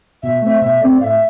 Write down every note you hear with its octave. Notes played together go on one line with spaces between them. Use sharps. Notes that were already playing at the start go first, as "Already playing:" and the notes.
B2 E5
A3 C4 E5
B2 E5
A3 C4 D5
A2 E5 F5